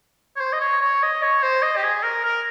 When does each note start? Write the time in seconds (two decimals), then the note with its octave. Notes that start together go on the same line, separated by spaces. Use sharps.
0.36 C#5
0.40 C5
0.52 D#5
0.61 C#5
0.81 C#5
1.02 D#5
1.22 C#5
1.43 C5
1.62 D#5
1.76 G4
1.83 G#4
2.03 A#4
2.24 A#4